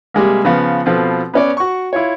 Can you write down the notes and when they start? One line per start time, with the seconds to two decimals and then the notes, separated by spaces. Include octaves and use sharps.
0.14 C3 G3 G#3 A#3
0.45 C#3 F3 B3
0.86 B2 F3 C4 A4 B4
1.34 B3 C#4 D5
1.57 F#4 C#6
1.93 E4 F4 C#5